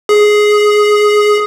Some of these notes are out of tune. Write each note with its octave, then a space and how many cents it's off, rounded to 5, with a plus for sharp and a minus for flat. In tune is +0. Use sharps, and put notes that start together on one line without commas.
G#4 +10